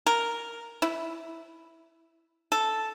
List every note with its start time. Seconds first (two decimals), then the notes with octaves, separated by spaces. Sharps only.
0.06 A#4
0.82 E4
2.52 A4